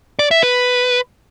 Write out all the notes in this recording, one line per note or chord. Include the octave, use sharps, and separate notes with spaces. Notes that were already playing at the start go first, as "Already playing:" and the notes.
D5
E5
B4